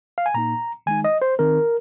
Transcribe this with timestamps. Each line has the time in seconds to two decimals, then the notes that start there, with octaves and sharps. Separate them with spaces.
0.18 F5
0.26 G#5
0.34 A#2 A#3 D#4 A#5
0.86 D#3 G#3 D#4 G#5
1.04 D#5
1.22 C5
1.39 D#3 C4 D#4 A#4